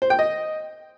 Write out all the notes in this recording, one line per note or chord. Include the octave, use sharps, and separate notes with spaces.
C5
G5
D#5